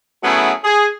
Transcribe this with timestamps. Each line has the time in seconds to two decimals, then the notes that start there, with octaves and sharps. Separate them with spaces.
0.24 F#3 A3 B3 C#4 E4 G#4
0.65 G#4